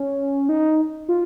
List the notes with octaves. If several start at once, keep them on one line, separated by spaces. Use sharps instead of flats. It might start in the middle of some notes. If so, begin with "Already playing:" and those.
Already playing: C#4
D#4
F4